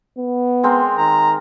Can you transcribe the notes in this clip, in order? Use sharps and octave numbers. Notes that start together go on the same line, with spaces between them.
B3
G#3 C4 A#4
D#3 A#5